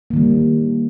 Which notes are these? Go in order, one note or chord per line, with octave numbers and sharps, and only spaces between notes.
D#3 G3 A#3